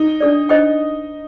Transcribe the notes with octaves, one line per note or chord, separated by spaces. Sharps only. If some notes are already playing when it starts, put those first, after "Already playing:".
Already playing: D#4
D4 A4 D5
D4 A4 C5 D#5 G5